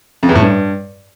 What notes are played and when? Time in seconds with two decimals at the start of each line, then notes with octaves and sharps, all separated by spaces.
0.23 F2
0.29 E2
0.35 A2
0.42 G2